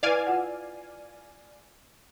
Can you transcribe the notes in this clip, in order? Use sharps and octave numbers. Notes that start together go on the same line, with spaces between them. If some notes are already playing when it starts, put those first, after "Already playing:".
E4 B4 D5 F5 G#5
F4 F#5